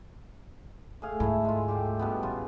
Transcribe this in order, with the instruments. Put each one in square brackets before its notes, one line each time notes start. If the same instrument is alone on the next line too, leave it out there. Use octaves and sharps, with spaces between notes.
[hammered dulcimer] A2 G#4 F5
[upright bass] D2 G#2 [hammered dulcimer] A3 E4
[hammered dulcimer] G#3 F4
A2 G3 G4
G2 B2 B3
[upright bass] A1 [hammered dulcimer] C#3 B3 F4